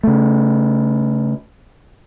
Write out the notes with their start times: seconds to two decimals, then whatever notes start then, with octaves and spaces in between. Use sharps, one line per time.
0.03 C#3 A3